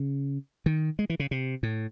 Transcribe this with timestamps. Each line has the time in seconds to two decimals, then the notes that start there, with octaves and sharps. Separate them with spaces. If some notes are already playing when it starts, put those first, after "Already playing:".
Already playing: C#3
0.66 D#3
0.99 G#3
1.10 E3
1.20 C#3
1.31 C3
1.63 A2